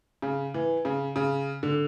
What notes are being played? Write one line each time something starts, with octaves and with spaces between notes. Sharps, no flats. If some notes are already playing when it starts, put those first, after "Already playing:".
C#3
E3
C#3
C#3
D3